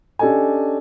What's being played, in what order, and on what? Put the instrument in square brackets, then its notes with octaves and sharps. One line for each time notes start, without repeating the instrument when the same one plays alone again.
[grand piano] C#4 D4 G4 A4 D#5 G#5